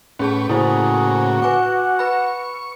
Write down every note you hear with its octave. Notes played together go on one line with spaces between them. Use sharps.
A2 C#4 G#4 B4 C#5 A5
A2 C#3 A#3 E4 F#4 G#4 C5
B4 F#5 G#5 D6
B4 B5 C#6